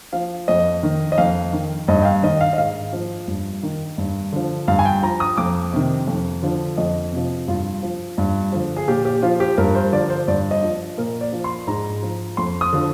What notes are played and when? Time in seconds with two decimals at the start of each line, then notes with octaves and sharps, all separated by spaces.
0.13 F3 F5
0.48 F2 D#5
0.83 D#3
1.12 D#5
1.18 F2 F5
1.53 D#3
1.88 G2 D#5
2.02 G5
2.05 F5
2.23 D#3 D#5
2.41 F5
2.53 D#5
2.58 G#2 F5
2.93 F3
3.28 G2
3.63 D#3
3.98 G2
4.32 D3 F3
4.68 G2 F5
4.79 G#5
4.85 G5
5.03 F3 A#5
5.20 D#6
5.37 F2 D6
5.73 C3 D#3
6.08 F2
6.43 D3 F3
6.77 F2 D#5
7.12 C3 F3
7.48 G2 F4
7.83 F3
8.18 G2
8.53 D3 F3
8.77 G#4
8.88 A#2 G4
9.05 G4
9.23 F3 F4
9.40 G4
9.58 G2 A#4
9.75 C5
9.93 D3 F3 D5
10.10 C5
10.28 G2 D5
10.51 D#5
10.63 F3
10.97 A#2 A#4
11.21 D5
11.32 F3
11.44 C6
11.67 G#2 A#5
12.03 F3
12.37 F2 C6
12.61 D#6
12.73 D3 F3